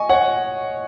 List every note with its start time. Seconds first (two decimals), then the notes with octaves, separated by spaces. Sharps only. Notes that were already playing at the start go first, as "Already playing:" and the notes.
Already playing: D#5 G#5 C#6
0.09 C#5 F#5